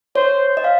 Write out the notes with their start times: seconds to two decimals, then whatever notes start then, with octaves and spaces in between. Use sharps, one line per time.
0.15 C5 C#5
0.57 D#5
0.64 F5